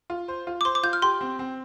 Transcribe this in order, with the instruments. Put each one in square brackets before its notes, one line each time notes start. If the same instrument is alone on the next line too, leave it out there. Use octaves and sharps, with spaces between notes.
[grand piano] F4
C5
F4
[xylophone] D6
[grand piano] C5 [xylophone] C6
[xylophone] D6
[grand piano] F4 [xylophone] G6
[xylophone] F6
[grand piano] G4 [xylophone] C6
[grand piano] C4
C4